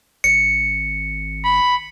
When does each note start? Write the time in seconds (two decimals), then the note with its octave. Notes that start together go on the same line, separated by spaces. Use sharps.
0.24 G#1 C#7
1.45 B5